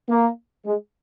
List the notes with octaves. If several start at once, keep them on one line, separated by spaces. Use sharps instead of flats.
A#3
G#3